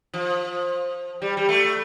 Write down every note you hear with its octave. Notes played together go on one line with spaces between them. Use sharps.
F3
G3
G3
A3